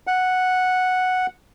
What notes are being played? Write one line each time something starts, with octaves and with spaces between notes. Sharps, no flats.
F#5